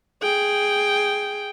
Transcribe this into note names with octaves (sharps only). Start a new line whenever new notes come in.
G#4 G5